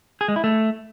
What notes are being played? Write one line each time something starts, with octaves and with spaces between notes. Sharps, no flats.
G#4
G#3
E4
A3